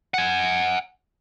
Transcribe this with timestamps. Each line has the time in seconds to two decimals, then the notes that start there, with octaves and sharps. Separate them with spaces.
0.14 F#5 G#5